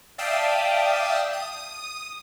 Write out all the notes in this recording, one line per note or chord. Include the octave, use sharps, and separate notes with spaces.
D5 E5 F5 G5 A5 D#6
D#6